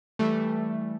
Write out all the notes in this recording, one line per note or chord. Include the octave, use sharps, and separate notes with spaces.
E3 G3 A3